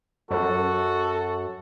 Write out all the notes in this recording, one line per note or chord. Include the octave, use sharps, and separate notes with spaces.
F#2 F#4 A4